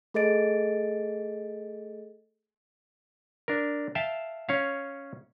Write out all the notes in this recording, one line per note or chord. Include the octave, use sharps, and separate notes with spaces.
A3 G#4 A4 D#5 A6 D7
D4 A#4
E5 F5 G5 A5
C#4 C#5 F5